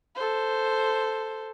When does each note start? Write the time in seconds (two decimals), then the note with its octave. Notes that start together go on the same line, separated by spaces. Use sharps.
0.16 A4 C5